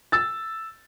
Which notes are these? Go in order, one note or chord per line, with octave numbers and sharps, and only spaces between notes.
E6 A6